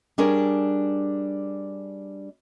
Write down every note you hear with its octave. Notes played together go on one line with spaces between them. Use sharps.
G3 D4 G#4 A#4 C#5